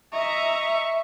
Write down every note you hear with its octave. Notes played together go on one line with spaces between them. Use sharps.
D#5 E5 A#5 C#6